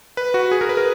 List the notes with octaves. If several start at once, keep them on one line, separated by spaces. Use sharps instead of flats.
B4
F#4
G#4
A#4
B4
A#4